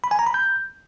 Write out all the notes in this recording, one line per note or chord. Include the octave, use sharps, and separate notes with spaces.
B5
G#5
A#5
B5
G6